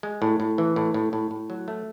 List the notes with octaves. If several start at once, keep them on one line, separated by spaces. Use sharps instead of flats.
G#3
A2
A2
E3
A2
A2
A2
A2
F#3
A3